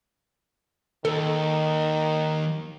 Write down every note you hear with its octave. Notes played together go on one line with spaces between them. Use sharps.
D#2 D#3 A4